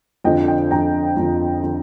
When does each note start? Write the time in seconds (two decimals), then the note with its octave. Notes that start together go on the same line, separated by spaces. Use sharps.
0.24 F2 D3 F3 D#5 G5
0.48 D#5 G5
0.71 F2 D3 F3 G5 A#5
1.17 F2 D3 F3
1.63 D3 F3